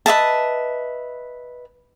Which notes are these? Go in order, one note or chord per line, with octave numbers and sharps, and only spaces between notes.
B4 D#5 E5 A5